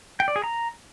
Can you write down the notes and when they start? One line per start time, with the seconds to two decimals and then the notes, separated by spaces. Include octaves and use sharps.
0.20 G5
0.28 D5
0.36 G#4
0.44 A#5